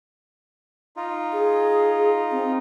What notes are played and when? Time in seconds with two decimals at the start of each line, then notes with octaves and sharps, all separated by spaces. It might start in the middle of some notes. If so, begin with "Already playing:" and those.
0.97 D#4 F4
1.33 G#4
2.32 C4